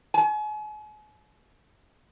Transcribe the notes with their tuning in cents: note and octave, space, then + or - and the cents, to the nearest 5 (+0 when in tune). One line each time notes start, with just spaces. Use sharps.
G#5 +40